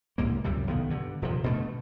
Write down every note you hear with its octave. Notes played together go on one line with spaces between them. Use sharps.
C2 G#2 A#3
C#2 F#2 C3 G3
B1 D#3 B3
G2 D3
D#1 C3 F3
B2 D3 F3 A3